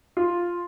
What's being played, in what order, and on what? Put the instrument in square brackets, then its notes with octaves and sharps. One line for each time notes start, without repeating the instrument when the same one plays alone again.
[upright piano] F4